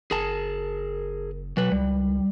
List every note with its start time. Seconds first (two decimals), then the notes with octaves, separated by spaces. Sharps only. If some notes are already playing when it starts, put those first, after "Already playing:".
0.11 F#1 G#4 A#4 A5
1.57 B2 F#3 B4
1.72 C#2 G3